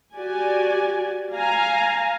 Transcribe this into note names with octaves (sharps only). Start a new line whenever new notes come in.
F#4 G4 D5 G#5
F5 G#5 A#5